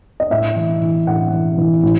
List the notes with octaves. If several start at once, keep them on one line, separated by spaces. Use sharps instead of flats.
D#5
A2 E5
E3
E3
A2 F#5
E3
E3
A2